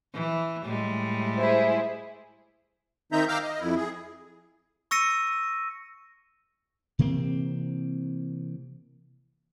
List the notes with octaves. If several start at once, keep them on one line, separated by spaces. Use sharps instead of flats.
E3
A2 G3 G#3
E4 G#4 C5
D#3 C4 D#4 E5 A#5 G6
F5 A#5 D6 E6 F6 G6
D#5
F2 E4
G#4
C#6 E6 A#6 C#7 D#7
C3 E3 A#3 C4